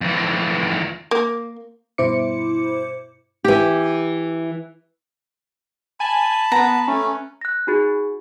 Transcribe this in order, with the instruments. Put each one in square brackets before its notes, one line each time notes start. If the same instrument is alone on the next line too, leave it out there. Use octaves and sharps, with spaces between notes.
[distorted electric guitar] F2 E3
[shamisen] A#3
[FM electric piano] G2 B2 E4 C5 D6 C#7
[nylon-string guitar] E3 G4
[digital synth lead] G#5 [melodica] A5 B5
[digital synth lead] B3 [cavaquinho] B4 A#5
[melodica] A3 [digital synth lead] C#4
[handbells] F#6 A#6
D#4 F#4 G#4